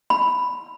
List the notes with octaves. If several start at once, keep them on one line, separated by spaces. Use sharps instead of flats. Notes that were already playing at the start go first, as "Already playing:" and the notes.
B5